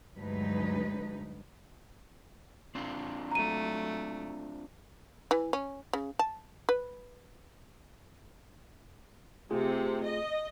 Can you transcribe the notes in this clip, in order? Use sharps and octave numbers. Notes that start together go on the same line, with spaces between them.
D2 G2 F#3 G#3 D#4 B4
C4 D4 F4
F#3 A3 A#5 D#7
E3
C#4
C#3
A5
B4
C3 A3 F4 G#4
D#5